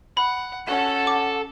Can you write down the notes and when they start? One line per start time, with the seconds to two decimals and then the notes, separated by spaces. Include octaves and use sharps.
0.17 F#5 B5
0.68 C#4 A4 F#5
1.07 D6